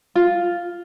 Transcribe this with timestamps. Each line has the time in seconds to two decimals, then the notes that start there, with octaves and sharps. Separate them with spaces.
0.15 F4